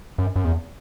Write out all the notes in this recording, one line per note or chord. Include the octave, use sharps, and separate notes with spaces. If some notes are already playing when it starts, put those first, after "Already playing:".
F#2
F#2
E2